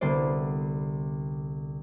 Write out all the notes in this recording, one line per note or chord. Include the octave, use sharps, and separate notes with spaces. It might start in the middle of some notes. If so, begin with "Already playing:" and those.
C2 D3 B3 C5 D5